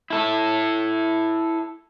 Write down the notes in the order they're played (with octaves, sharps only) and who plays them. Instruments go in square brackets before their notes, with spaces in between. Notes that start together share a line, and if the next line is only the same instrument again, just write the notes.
[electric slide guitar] E4 A4